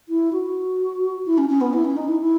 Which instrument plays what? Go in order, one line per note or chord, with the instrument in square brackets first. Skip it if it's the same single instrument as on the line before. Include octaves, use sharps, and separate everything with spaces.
[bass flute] E4
F#4
E4
C#4
C#4
B3
E4
C#4
D#4
E4
E4